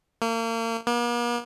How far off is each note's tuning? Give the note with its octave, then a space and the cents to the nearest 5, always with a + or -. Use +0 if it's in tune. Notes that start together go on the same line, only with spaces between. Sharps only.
A#3 -35
A#3 +45